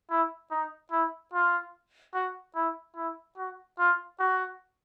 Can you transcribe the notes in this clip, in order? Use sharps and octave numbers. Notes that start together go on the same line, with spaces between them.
E4
D#4
E4
F4
F#4
E4
E4
F#4
F4
F#4